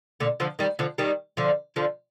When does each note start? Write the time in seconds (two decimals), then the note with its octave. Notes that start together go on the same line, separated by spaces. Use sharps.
0.20 A#2 D3
0.40 D3 F3
0.59 D#3 G3
0.79 D3 F3
0.98 D#3 G3
1.37 D3 F3
1.76 D3 F3